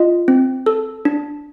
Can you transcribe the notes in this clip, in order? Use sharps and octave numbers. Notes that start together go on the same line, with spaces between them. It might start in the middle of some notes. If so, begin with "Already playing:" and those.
Already playing: F4 D#5
C4
A4
D4